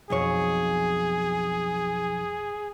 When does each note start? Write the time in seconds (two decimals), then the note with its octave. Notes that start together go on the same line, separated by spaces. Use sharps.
0.10 B1 F2 G#4 C#5